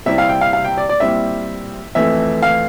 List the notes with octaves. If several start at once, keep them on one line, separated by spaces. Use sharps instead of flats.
C3 G3 C4 E4 E5
F5
G5
F5
F5
G5
D5
D5
A#2 G3 C4 E4 E5
F2 E3 A3 E5
F5